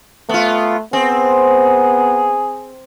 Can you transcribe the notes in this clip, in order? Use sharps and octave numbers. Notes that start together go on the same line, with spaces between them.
A3 B3 F4
B3 C4 G#4